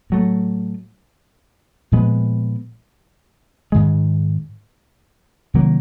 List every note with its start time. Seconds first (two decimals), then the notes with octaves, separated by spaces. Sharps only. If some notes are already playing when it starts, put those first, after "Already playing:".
0.10 A2 F#3 A3
1.92 A#2 F3 G#3 B3
3.72 G#2 D#3 G#3
5.54 C3 D#3 F#3 A#3